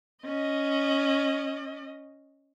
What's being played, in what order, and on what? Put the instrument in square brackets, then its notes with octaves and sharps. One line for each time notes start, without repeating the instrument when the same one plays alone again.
[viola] C#4 D#5